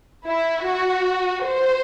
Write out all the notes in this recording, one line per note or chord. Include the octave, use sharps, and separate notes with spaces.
E4
F#4
C5